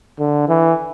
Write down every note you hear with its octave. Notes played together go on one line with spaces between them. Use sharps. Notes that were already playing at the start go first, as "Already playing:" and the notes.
D3
E3